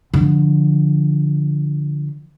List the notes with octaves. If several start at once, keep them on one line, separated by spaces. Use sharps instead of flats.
D3 F3